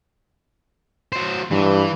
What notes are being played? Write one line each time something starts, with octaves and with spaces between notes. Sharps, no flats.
F#3 C5
G2 E3